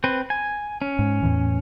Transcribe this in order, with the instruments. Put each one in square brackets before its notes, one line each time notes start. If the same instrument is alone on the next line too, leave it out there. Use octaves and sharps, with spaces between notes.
[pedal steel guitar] C4 B4
G#5
C#4
[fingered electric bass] G#2
E2 A2 E3